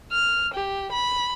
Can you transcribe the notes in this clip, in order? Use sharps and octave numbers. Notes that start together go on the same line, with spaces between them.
F6
G4
B5